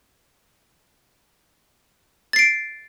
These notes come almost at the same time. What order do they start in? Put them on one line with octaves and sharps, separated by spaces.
A6 C7 D7